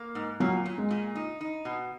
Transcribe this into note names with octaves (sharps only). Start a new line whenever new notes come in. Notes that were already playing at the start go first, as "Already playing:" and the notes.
Already playing: A#3
G#2
A#2 F#3
A#2
G#3
A#2
D#4
D#4
B2